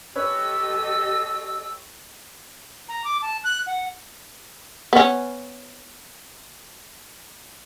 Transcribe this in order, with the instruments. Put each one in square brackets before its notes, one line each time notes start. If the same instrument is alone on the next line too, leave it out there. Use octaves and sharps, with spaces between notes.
[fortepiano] C#4 B4 C#5 [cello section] G4 A4 D#5 [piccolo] E6
[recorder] A#5
D6
A5
F#6
F#5
[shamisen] B3 C#4